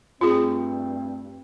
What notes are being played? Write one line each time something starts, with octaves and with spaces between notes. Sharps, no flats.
G2 A3 C4 F4 G#4